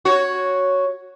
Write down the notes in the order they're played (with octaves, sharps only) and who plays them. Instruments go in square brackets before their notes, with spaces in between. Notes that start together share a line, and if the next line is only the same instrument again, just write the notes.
[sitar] F#4 C#5